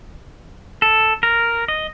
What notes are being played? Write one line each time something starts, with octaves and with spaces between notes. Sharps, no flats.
A4
A#4
D#5